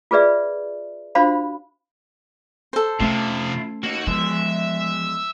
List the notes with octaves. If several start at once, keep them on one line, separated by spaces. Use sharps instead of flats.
F4 G#4 B4 D5 E5
D4 F4 F#4 C5 F5 B5
A4 C5
C3 F3 A3 C#4 F4 E5
A#3 D#4 F#4
F3 G#3 B3 E5